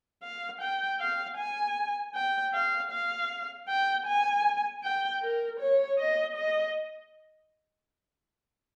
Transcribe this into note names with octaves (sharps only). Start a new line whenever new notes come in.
F5
G5
F5
G#5
G5
F5
F5
G5
G#5
G5
A#4
C#5
D#5
D#5